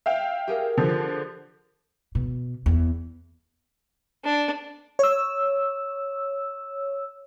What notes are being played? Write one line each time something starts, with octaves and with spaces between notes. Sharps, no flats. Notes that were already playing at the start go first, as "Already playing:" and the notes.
E5 F5 G5
G4 G#4 A#4
D3 F3
B2
E2
D4
C#5 E6